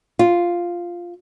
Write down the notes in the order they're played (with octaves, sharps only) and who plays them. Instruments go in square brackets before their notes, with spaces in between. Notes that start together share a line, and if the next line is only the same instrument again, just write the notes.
[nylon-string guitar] F4